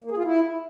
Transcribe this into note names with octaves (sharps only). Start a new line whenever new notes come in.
A#3
G#4
F4
E4